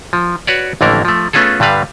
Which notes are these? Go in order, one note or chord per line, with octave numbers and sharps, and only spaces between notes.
F3
F#4 B4 C#5 D5
A1 F2 D3 A3 A#3 A#4
F3 A3
A3 B3 C#4 F4 G#4 A4
G2 D3 G3 B4 F5